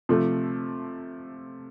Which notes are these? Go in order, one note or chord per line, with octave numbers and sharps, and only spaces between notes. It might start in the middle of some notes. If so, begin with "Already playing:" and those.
C3 F3 A3